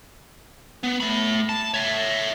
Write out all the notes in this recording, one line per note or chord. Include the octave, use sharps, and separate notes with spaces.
B3
A3 B5
A5
C#5 E5